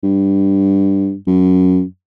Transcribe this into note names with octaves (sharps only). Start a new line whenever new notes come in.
G2
F#2